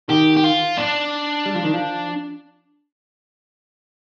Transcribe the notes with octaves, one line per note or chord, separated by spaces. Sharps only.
D#3 G4
G4
F4
D4
G3
F3
D#3
F3